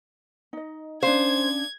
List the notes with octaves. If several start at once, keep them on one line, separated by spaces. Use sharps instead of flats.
D#4 D#5
C#4 D4 C5 F5 G#6